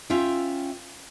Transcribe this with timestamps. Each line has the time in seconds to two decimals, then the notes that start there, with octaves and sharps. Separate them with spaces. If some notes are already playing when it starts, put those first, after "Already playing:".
0.10 C#4 F4 E5 G5